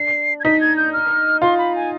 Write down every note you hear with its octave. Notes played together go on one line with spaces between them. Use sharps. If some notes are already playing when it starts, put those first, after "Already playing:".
Already playing: D4 C7
G#6
D#4 B6
G#6
G6
F6
F4 C6
B5
G#5